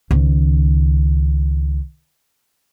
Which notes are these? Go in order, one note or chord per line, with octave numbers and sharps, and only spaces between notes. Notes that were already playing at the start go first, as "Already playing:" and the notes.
C#2 D#3